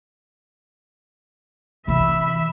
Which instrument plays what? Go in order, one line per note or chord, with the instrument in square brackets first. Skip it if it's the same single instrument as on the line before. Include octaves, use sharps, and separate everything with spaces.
[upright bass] C3 E3 [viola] E5 B5